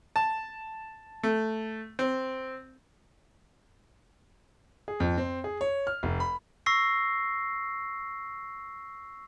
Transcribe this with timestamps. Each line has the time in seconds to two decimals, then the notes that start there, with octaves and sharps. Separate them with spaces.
0.16 A5
1.23 A3
1.99 C4
4.88 G#4
5.00 F2
5.18 C4
5.44 G#4
5.61 C#5
5.87 F6
6.03 F1
6.20 B5
6.66 C#6 E6 A#6 C7